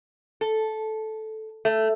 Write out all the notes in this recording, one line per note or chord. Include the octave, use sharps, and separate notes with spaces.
A4
A3